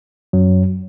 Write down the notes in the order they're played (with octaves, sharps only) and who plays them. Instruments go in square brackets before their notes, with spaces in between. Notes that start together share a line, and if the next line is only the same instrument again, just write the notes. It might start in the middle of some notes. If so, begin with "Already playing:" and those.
[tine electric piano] F#2 F#3